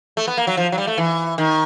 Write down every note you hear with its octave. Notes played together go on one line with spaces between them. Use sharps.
A3
B3
A#3
F#3
F3
F#3
G3
A3
E3
D#3